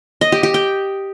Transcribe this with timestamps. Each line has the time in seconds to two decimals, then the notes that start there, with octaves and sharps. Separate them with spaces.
0.21 D#5
0.32 G4
0.43 G4
0.54 G5